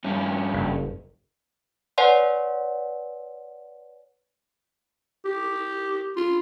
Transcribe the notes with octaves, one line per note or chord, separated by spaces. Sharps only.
G2 C#4
F#1
B4 C#5 D5 F#5 G#5 C6
G4
F4